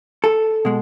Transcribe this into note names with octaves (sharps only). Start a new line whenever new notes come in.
A4
B2 G#3